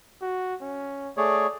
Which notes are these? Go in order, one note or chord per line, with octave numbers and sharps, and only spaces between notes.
F#4
C#4
A3 G#4 C#5 D5